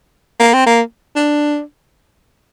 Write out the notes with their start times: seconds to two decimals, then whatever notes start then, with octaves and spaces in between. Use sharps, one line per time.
0.40 A#3
0.53 C4
0.66 A#3
1.16 D4